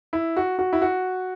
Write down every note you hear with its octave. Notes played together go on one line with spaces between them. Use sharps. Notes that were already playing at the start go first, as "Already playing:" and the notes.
E4
F#4
F#4
E4
F#4